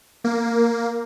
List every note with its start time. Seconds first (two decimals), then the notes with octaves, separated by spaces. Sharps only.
0.24 A#3